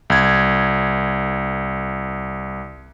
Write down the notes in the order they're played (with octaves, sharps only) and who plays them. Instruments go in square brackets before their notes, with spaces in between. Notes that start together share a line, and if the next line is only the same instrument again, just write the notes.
[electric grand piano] C2 G#6